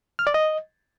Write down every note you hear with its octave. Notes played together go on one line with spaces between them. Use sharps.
F6
D5
D#5